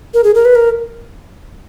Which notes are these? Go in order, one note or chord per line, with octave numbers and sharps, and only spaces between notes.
A#4
G#4
A#4
B4
A#4